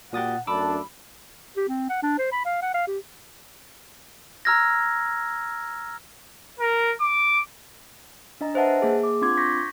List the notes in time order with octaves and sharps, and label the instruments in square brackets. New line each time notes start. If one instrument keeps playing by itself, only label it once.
[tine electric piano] A#2 D#6 A6 [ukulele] F#4 G4 [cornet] F#5
[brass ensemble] F#2 A3 D4 [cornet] A5 [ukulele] B5 [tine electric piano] D6 E6
[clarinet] G4
C4
F#5
D4
C5
B5
F5
F#5
F5
G4
[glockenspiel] A#5 E6 F6 G#6 A#6
[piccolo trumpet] A#4
D6
[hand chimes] D4 D#5 A#5
B4 C5 D#5 E5 F#5 A5
A#3 G#4
D6
C4 D4 F4 C6 D6 G#6
C#6 G6 A#6 B6